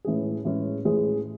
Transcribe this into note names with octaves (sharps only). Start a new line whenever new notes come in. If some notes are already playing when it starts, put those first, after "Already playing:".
A2 E3 G#3 C#4 G#4
A2 E3 G#3 C#4 G#4
A2 E3 G#3 C#4 G#4